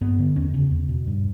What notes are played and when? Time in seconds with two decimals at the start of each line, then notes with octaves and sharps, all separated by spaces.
0.01 G2 B3
0.19 D3
0.36 E2 C#4
0.54 C#3
0.71 E2
0.89 B2
1.07 G2